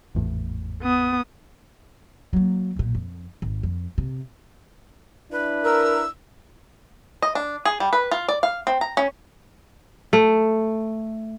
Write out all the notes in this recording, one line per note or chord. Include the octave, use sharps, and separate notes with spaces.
G#1 E2 A2
B3 D#6
F#3 A#3
B1 A#2
F2
G#1
F2
C3
D4 E4 B4
A#4 E6
D#5
D4
G#4
G3
B4
F4
D5
F5
C4
A#5
C#4
A3